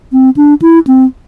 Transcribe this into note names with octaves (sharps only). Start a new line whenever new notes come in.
C4
D4
E4
C4